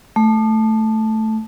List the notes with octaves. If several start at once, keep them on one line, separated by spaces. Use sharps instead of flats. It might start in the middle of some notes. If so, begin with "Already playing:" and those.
A3